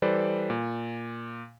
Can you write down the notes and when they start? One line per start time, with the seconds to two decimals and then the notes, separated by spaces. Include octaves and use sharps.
0.02 E3 G3 A4 B4 C5 D5
0.50 A#2